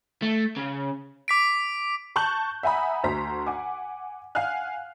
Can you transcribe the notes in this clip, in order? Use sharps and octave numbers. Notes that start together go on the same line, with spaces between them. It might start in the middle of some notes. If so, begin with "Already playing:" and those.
A3
C#3
D6 B6 D7
A5 C#6 F#6 G6 F#7
E5 F#5 G#5 A#5 B5 D#6
D2 F#4 C5 A#5 C6 B6
F#5 G#5 D6
F5 F#5 G#5 F6 F#6